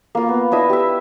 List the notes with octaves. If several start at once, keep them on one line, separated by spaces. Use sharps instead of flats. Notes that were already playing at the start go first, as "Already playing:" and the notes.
A#3 F4
B3
D4 E4 D#5 E5
G4 E5